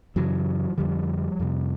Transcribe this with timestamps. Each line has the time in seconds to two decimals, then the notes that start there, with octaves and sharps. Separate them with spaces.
0.16 F#2 C#3 E3 F#3
0.78 F2 D3 F3 G3
1.39 F2 C3